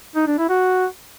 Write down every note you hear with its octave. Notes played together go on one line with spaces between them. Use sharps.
D#4
D4
E4
F#4